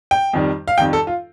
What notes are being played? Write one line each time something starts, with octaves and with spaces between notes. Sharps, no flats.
G5
F2 D#3 G3
F5
F2 D#3 G3 G5
A4
F4